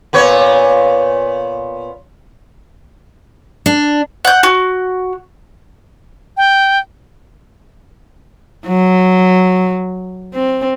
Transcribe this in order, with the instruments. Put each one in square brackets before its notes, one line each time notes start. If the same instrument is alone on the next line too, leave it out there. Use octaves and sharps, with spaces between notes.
[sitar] A#2 B3 C#5
[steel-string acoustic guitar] D4
[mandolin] F#5 G6
F#4
[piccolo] G5
[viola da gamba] F#3
C4